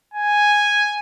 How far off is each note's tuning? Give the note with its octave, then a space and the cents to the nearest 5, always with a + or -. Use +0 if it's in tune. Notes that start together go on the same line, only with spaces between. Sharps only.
G#5 -5